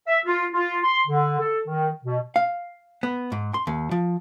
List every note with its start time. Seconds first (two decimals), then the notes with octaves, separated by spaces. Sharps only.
0.07 E5
0.26 F4
0.52 F4
0.84 C6
1.07 D3
1.39 A4
1.67 D#3
2.04 B2
2.36 F5
3.03 B3
3.32 G#2
3.54 C6
3.67 D#2
3.91 F3